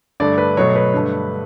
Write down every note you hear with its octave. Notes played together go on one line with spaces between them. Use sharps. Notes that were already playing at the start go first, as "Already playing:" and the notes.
G2 D3 A3 D5
B4
B2 F#3 A3 C#5
B4
G2 D3 A3